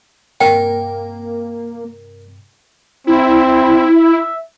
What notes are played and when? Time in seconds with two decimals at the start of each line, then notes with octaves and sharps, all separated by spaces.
0.41 G2 C3 A#3 A#4 G5
3.07 C4 E4
3.96 E5